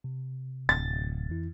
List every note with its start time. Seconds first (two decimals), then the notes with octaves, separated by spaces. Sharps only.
0.04 C3
0.69 D1 A6
1.29 F2 E3 E4